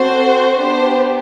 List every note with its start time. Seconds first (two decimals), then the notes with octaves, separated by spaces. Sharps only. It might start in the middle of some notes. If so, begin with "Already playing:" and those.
Already playing: C4 F#4 A4 C5
0.59 B3 D4 G4 C5